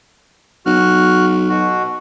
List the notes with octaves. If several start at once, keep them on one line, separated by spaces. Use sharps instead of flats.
B1 F#4 F6 F#6
B2 F#4